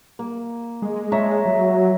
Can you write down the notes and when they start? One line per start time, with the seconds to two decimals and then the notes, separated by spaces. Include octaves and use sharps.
0.19 A#3
0.82 G#3
1.12 C#5 E5 A#5
1.45 F#3